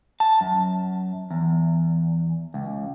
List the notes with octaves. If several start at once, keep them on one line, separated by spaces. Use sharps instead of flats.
A5
F#2
E2
C#2